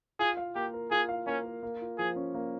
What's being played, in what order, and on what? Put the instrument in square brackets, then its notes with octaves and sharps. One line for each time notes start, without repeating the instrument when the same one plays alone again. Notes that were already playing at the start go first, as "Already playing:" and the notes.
[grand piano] F4 [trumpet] G#4
[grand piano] F5
[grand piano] A#3 [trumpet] G4
[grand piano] A#4
[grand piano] F4 [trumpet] G#4
[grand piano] F5
[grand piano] A#3 [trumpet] C#4
[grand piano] A#4
A#3
F4
[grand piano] F3 [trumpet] G#4
[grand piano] C#4
A#3